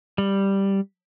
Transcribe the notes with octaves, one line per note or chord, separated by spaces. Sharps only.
G3